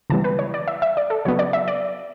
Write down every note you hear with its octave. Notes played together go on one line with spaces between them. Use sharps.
C#3 E3 G3 B3 A5
B4
C#5
D5
E5
E5
D5
A4
C#3 F#3 B3 C#5
D5
E5
D5